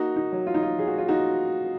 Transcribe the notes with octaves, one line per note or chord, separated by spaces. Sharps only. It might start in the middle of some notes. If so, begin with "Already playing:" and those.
Already playing: A#3 D#4 F#4
D#4
F#3
F4
D#4
F4
F#3 G#4
F#4
F4
D#4 F#4